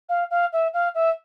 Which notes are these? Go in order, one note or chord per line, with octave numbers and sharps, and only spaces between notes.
F5
F5
E5
F5
E5